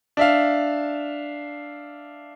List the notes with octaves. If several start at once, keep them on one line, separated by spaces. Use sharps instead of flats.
D4 E5 F5